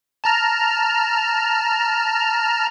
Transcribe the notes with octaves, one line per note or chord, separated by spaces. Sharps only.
A5 A#5 F6